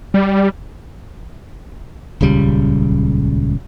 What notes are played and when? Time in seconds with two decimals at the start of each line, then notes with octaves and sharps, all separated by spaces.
0.14 G3
2.21 D#1 C#2 C#3 G3